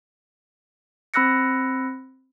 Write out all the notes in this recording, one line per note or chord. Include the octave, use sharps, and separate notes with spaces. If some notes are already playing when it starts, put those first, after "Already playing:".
C4 B5 E6 F#6 A#6 C#7